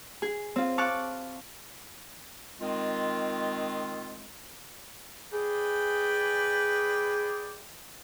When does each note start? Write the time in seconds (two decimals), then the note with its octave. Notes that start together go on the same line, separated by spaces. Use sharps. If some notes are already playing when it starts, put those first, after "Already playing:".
0.22 G#4
0.56 C4 F4
0.78 F5 A5 C#6 D6 F6 F#6
2.61 D#3 G#3 C4 F4
5.32 G#4 B4 D5 G5